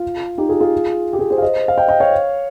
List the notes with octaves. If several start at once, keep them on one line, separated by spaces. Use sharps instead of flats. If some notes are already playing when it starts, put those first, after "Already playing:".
Already playing: F4
D#4 G4
F4 G#4
F4 G#4
G4
F4 G#4
G#4 C5
F5
C5 D#5
F5
D#5 G5
D#5 G5
C#5 F5